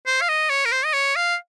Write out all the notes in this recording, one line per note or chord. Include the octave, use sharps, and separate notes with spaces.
C5
F5
D#5
C#5
A#4
C5
D#5
C#5
F5